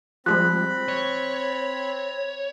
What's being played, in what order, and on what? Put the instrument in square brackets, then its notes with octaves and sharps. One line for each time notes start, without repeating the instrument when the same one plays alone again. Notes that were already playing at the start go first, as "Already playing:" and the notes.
[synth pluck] F3 G3 G#3 [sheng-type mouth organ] C4 B5 [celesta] F#6
[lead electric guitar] C#5